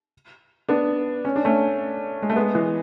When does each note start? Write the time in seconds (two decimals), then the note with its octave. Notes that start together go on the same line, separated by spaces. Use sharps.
0.69 B3 D4
1.25 C#4
1.36 D4
1.45 A3 C#4
2.22 G#3
2.30 A3
2.36 G#3 B3
2.55 E3 G#3